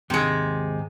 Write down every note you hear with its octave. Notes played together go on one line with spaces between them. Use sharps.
D#2 G#2 C3 G#3 C6